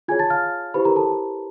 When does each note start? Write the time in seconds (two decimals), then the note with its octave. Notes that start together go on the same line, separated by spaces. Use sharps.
0.08 F4 G#4 C#5 G#5 G#6
0.19 A5 A6
0.30 F5 F6
0.74 E4 G4 B4 C5 B5
0.85 A#4 A#5
0.96 A4 A5